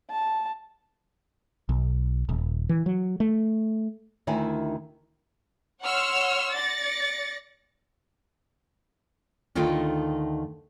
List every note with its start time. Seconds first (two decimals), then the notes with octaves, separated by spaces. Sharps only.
0.10 A5
1.69 B1
2.29 D#1
2.69 E3
2.86 F#3
3.20 A3
4.27 D2 D#3 E4 E5 G#5
5.81 C#5 F#5 C6 C#6 E6 F6
6.53 D5 A6 A#6 C#7
9.55 D2 D#3 A3 D#4 F4 G5